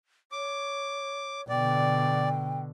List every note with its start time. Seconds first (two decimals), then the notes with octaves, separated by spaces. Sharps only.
0.32 C#5 D6
1.49 B2 D3 D5 G5